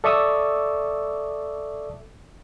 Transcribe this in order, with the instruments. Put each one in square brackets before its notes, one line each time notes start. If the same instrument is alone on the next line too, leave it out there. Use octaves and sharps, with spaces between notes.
[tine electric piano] A4 D5 E5 C#6 D#6 E6